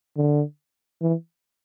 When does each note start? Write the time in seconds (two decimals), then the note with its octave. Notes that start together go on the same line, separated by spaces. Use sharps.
0.17 D3
1.01 E3